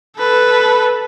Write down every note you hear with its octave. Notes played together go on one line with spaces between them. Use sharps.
A4 B4